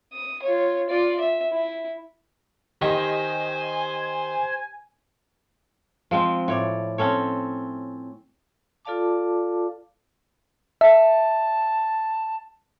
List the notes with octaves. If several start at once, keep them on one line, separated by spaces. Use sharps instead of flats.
D#6
F4 C#5
F4 D5
E5
E4
D#3 G4 C5 D#5 G#5 C#6
F3 G#3 C4
A2 C#5 D5
C4 C#4 A4 C#5
F4 A4 D5 F5 A5 D6
E5 A5